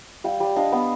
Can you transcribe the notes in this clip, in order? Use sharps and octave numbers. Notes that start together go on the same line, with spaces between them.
G3 F5 G5
G3
D4 D#5 F5
B3